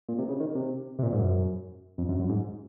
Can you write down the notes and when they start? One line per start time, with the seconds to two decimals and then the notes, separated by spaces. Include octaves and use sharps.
0.09 A#2
0.18 C3
0.29 C#3
0.40 D#3
0.55 C3
0.99 C3
1.03 A#2
1.12 G#2
1.19 F#2
1.98 F2
2.08 F#2
2.19 F#2
2.29 G#2